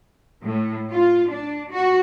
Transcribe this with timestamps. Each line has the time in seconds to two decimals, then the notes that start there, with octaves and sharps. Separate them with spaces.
0.44 A2
0.91 F4
1.30 D4
1.72 F#4